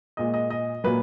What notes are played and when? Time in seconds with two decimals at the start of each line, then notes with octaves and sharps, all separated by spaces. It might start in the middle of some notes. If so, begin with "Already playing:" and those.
0.17 A#2 G#3 D#5
0.34 D#5
0.50 D#5
0.84 A#2 F#3 B4